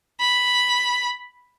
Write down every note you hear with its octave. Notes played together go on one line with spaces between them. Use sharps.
B5